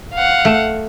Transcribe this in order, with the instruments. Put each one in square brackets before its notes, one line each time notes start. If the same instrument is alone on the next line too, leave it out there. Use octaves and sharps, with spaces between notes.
[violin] F5 F#5
[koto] A3